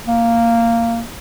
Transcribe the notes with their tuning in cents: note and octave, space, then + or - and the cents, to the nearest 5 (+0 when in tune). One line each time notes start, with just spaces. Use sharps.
A#3 -10